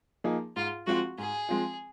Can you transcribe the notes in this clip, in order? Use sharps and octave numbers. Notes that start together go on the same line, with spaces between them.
F3 A#3 D#4 G#4
G#2 F4
F3 G#3 C4 F4 F#4
G#2 G#4
F3 G#3 C4 F4